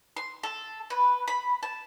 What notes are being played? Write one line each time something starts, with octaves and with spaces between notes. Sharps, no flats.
C6
A4
B4
B5
A5